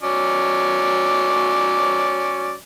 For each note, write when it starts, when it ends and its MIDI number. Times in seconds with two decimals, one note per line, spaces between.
0.03 2.53 54
0.03 2.53 61
0.03 2.53 74